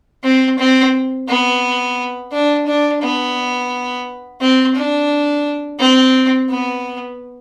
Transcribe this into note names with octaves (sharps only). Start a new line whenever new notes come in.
C4
C4
B3
D4
D4
B3
C4
D4
C4
B3